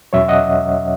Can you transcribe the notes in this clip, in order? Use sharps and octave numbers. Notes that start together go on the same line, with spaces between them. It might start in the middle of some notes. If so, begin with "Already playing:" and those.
E2 B2 F#3 C#4 C#5 E5
D#5 F#5